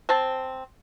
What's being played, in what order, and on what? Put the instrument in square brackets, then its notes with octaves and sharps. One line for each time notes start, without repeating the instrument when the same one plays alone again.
[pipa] C4 C5 A5